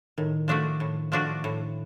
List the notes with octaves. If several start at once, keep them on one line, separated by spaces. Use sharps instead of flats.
A2 D#3
F3 A3 D4 F#4
A2
F3 A3 D4 F#4
A2